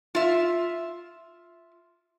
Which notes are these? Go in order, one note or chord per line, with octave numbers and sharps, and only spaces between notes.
F4 E5